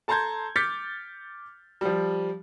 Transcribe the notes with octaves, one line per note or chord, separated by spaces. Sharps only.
A4 A5 A#5 C6 G6 G#6
D6 F6 G6 A6 B6 C#7
F3 G3